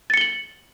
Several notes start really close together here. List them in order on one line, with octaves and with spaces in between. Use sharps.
A6 C#7 G7 F#7